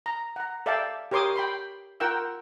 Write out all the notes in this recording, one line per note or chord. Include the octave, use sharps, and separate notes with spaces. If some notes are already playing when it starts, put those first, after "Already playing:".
A#5
F#5 A#5
A4 D5 E5 F5 G5 A5
G4 A#4 C#5 C6 D6 D#6
G5 B5 C6
F4 A#4 F#5 G5 E6